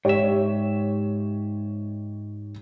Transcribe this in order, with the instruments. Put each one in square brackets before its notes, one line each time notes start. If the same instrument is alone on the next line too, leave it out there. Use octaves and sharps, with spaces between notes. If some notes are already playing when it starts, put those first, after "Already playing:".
[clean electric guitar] G#2 E5 [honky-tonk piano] G4 C#5